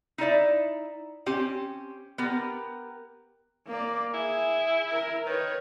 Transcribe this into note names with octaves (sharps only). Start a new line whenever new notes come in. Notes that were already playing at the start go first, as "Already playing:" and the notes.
D#4 E4 D5 E5
C4 C#4 G4
B3 G4 A#4
A#3 D5
E4 G#4 G#5
A#4
D#3 B4 C#5